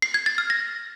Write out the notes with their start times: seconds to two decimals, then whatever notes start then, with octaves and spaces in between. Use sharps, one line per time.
0.02 C7
0.14 G#6
0.26 A6
0.38 F6
0.50 A#6